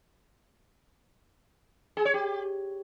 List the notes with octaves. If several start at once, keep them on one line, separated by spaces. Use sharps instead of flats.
G#4
C#5
G4